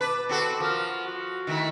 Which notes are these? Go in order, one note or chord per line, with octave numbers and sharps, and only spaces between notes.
B2 B4 A5 D6
C4 F#4 A4
F3 F#4 A#4
F#4
D#3 A3 E4